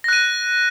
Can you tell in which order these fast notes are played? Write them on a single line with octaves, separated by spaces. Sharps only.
A#6 F#6 D#7